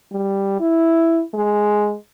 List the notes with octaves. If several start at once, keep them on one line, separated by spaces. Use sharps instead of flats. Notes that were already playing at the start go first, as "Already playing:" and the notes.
G3
E4
G#3